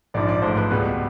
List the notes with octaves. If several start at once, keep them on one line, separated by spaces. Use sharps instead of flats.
A#1 G#2 F3 D5
D5
A1 G#2 F3 A3 C5
B4
C#2 B2 G3 B3